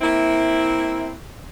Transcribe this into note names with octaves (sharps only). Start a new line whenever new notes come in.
A#3 C4 E4